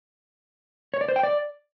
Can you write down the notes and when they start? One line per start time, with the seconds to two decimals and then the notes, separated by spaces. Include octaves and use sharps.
0.94 C#5
1.01 D5
1.08 C5
1.16 G5
1.23 D5